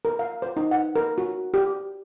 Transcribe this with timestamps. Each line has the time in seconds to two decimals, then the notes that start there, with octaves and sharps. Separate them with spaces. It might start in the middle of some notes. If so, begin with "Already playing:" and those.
0.05 A#4
0.19 F5
0.42 C5
0.57 D#4
0.71 F#5
0.96 A#4
1.18 F#4
1.54 G4